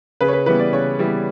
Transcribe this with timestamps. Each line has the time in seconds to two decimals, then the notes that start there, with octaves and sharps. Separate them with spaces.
0.21 C#3 B4
0.28 C#5
0.33 B4
0.46 E3 G3 B3 B4
0.59 D5
0.72 C#3 C#5
0.99 E3 G3 B3